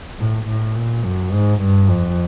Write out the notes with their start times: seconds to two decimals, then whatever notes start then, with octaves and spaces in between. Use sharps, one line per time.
0.19 A2
0.47 A2
0.76 A#2
1.04 F#2
1.33 G#2
1.61 G2
1.90 F2